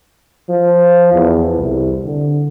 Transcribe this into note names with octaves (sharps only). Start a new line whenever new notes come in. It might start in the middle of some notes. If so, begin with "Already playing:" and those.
F3
E2
C2
D3